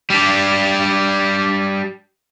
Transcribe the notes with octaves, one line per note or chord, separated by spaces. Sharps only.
G3 D4